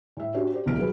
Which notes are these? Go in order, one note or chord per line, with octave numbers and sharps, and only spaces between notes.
A2 E5
C#4 D4 F#4 G4 C#5
G4 C5 D5
D#1 C2 B2 F3 F6 D7
F#3 G#4 B4